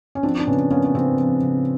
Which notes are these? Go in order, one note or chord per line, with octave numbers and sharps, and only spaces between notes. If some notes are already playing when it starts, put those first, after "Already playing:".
C#4
F3 C4 D4
D4
C#3 B3 C#4
A#3 B3 C#4
C#4
C#3 C4
F3
C#3